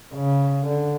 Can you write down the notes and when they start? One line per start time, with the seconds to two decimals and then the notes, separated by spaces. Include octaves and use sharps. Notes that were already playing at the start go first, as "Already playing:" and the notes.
0.14 C#3
0.67 D3